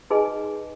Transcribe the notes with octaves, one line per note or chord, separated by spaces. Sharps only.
D#4 G#4 B4 D#5 G#5